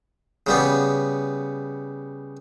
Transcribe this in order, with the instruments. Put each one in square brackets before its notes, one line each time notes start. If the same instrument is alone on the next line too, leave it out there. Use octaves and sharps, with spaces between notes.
[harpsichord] C#3 G3 B3